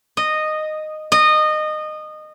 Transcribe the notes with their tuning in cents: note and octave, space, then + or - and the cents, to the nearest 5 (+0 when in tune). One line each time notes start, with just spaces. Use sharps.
D#5 -10
D#5 -20